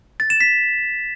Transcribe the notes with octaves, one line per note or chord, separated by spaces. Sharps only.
A6
E7
B6